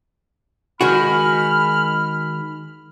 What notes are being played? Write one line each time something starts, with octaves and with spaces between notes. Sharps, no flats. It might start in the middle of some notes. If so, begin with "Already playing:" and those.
D#3 G#3 F#4 B5 F6